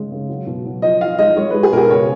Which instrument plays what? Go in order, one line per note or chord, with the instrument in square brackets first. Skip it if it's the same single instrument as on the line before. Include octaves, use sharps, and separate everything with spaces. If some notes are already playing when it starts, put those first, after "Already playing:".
Already playing: [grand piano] C#3 G#3
C#3
F#3
B2
F#3
F3 D#5
F3 F5
G#3 D#5
G#3 C#5
G#3 B4
G#4
B2 A#4
G#4
C#3 C#5